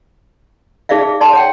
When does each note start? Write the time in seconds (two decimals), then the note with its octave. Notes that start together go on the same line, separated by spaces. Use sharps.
0.89 D#4 G#4 D5 E5 F5
1.03 G#4
1.21 D5 A5 C6
1.33 C#5 F#5 G5